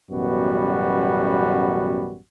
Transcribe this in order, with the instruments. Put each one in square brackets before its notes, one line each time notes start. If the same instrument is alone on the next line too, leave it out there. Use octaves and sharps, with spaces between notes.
[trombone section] A1 F#2 B2 G3 B3 F#4